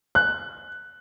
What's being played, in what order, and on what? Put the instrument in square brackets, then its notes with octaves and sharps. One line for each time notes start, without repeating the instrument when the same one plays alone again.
[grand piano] F#6